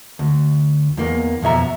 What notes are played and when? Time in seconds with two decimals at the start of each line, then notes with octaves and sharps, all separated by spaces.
0.19 D2
0.97 E2 A#3
1.42 F2 B2 E5 A#5